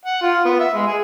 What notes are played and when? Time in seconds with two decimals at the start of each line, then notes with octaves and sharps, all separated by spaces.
0.05 F#5
0.22 F4
0.45 B3
0.60 E5
0.74 G#3
0.87 G#4